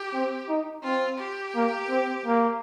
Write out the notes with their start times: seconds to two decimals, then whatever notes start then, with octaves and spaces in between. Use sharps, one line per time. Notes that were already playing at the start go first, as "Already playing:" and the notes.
Already playing: G4
0.13 C4
0.49 D#4
0.83 C4 F4
1.19 G4
1.55 A#3
1.89 C4
2.26 A#3